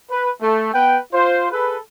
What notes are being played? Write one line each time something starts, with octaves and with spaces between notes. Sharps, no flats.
B4
A3
B3 B4 G5
F4 C5
G#4 A4 B4